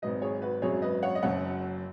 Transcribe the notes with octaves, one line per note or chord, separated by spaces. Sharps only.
G#1 G#2 F#3 B4 D#5
G#4 C#5
F#4 B4
G#1 F#2 F#3 G#4 C#5
B4 D#5
C#5 F#5
D#5
F#1 F#2 F#3 C#5 F#5